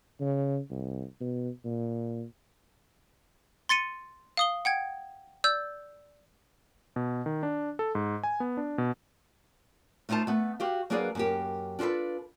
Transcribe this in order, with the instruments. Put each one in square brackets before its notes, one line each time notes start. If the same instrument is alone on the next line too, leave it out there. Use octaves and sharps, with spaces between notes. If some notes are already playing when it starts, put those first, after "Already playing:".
[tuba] C#3
C2
B2
A#2
[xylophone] C6 A6 C#7 D#7
F5 D#6 G7
F#5 G5 G#6
D5 E6 G6
[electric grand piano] B2
D#3
D4
A4
G#2
G#5
B3
D4
B2
[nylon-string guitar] A3 D#4 F4 C5 A5
A3 B3
F#4 G4 F5
F#3 A#3 D4 G#4 B4 D5
F#2 A#3 G4
D4 F4 F#4 A4 B4